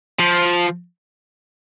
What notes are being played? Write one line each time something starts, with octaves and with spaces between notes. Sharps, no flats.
F3